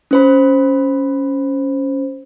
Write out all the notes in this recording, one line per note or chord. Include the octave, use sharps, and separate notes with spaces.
C#4 C5 B5